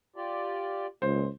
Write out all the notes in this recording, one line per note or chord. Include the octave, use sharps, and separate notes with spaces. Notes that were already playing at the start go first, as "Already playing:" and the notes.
F4 G4 D5
C#2 A#2 C5